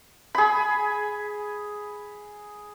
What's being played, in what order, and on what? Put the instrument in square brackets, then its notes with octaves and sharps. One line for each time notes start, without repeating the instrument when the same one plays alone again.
[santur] G#4 B5